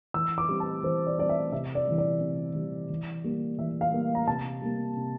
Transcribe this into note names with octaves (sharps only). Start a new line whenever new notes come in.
E3 E6
D6
G3 C4
A5
E3 C5
D5
G3 C4 D5
E5
C3 E5
D5
E3 G3
D5
C3
E3 G3
E3
G3 A#3
E3 E5
F5
G3 A#3
A#5
C3 A5
G3 A#3
C3